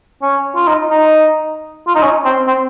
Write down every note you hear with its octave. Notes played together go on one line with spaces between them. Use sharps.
C#4
F4
D#4
D#4
F4
D#4
C#4
C4
C4